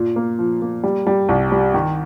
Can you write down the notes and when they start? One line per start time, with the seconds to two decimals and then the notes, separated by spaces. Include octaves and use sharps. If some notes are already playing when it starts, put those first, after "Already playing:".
Already playing: A#2
0.16 A#3
0.39 F3
0.62 A#3
0.83 G3
1.07 G3
1.29 C2
1.52 G3
1.74 D#3